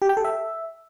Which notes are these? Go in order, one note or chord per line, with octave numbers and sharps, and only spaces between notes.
G4
G5
A4
E5